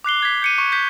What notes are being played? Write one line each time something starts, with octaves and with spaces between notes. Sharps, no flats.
D6 F#6 C7 G7
G#6 B6
G6 C#7 D#7
C#6
G6 B6